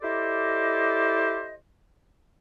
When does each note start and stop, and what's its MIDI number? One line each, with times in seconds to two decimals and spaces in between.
0.02 1.54 64
0.02 1.54 67
0.02 1.54 69
0.02 1.54 72
0.02 1.54 74
0.02 1.54 75